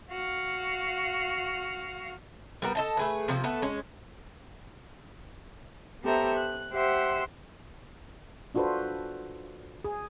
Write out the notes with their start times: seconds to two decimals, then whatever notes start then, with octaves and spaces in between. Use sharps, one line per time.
0.11 F#4 F5
2.62 G3 B3 A#4
2.75 A4 D#5 A5
2.97 A3 G#4 B4
3.28 C3 F3 A#3
3.44 A3 B3 A4
3.62 G#3 C#4
6.05 B3 G4 A4 C5 E5 A#5
6.37 F#6
6.73 G4 C5 E5 F#5 C6 E6
8.55 D4 F4 F#4 A4 B4 C5
9.85 G#4